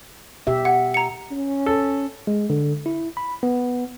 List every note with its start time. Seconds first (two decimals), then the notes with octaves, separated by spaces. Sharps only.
0.47 B2 G4 E5
0.65 F#5
0.94 A#5 C#7
1.31 C#4
1.66 A4
2.27 G#3
2.50 D3
2.86 E4
3.17 B5
3.43 B3